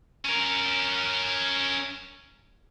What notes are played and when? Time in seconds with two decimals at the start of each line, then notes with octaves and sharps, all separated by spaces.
0.25 C#4 A#4